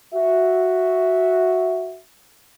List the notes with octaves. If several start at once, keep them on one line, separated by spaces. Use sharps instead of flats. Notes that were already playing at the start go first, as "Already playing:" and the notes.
F#4 E5